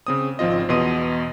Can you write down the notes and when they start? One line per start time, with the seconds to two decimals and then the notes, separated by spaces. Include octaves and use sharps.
0.07 C#3 C4 D#6
0.39 G#1 F3 C4 F4 D#5
0.69 E2 B2 D#5 C6 D#7